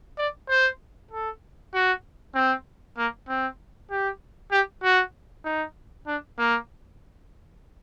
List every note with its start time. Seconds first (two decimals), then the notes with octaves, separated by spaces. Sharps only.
0.18 D5
0.49 C5
1.11 A4
1.74 F#4
2.35 C4
2.97 A#3
3.28 C4
3.91 G4
4.51 G4
4.83 F#4
5.45 D#4
6.07 D4
6.38 A#3